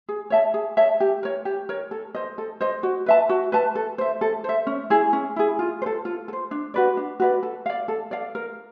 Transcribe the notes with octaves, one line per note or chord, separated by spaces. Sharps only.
G#4
C#5 E5 A5
G#4
C#5 E5 A5
G4
A#4 C#5
G4
A#4 C#5
A4
C5 D#5
A4
C5 D#5
F#4
B4 E5 A5
F#4
B4 E5 A5
A4
C5 E5
A4
C5 E5
C#4
E4 G#4
C#4
E4 G#4
F4
C5
A4
F4
A4
C5
D4
F#4 B4 D5
D4
F#4 B4 D5
A4
D5 F5
A4
D5 F5
A#4